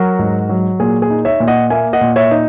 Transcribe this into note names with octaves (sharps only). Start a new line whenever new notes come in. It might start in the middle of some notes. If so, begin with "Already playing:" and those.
Already playing: F#3 F#4 A#4
G#2
F#3
A#2 G#4
G#4
D#4
C#5 E5
A#2
D#5 F#5
A#3 E5 G#5
D#5 F#5
A#2
C#5 E5
D#4